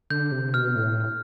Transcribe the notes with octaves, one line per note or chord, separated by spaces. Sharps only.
D3 G6
C3
B2 F6
A2